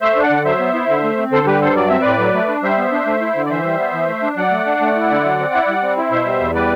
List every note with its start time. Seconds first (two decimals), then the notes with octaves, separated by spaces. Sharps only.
0.01 A3 C5 E5
0.16 D4
0.23 D5 F#5
0.31 D3
0.45 F#3 C5 E5
0.60 B3
0.74 E4
0.89 D3
1.03 A3
1.18 C4
1.32 D3 A4 C5
1.47 G3 G4 B4
1.61 G2 A4 C5
1.76 F#3 D5
1.89 C4 E5
2.01 A2 B4 D5
2.19 F#3
2.34 A3
2.48 D4
2.63 G3 C5 E5
2.78 B3
2.92 D4
3.06 A3
3.21 E4
3.35 D3
3.46 D5
3.50 E3 C5 E5
3.65 G3
3.79 B3
3.94 E3
4.08 A3
4.23 D4
4.37 F#3 D5 F#5
4.51 A3
4.66 D4
4.81 A3
4.96 E4
5.10 D3
5.25 F#3
5.39 C4
5.54 E4
5.68 G3
5.82 C4
5.97 E4
6.11 B2 C5 E5
6.26 G3
6.41 E2
6.55 G3 B4 D5